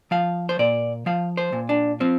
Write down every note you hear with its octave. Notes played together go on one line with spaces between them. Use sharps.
F3 F5
C5
A#2 D5
F3 F5
C5
A#2
D4
F3 C4